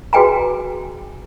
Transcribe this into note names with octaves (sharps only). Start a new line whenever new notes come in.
F#4 G#4 B4 G5 G#5 A#5